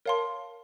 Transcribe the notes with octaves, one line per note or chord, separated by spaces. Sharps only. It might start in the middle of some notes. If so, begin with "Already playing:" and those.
A#4 C#5 F5 A5 C6